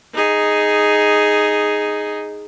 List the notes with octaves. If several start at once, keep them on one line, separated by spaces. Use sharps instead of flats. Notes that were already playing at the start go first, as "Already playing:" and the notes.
D#4 G#4